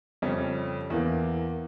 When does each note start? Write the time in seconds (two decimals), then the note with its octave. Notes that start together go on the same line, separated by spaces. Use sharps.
0.22 F2 C#3 G3 C#4
0.90 E2 E3 A#3